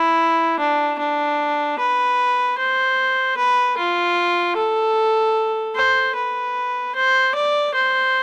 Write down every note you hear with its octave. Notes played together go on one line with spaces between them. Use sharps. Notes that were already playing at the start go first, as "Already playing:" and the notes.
Already playing: E4
D4
D4
B4
C5
B4
F4
A4
C5
B4
C5
D5
C5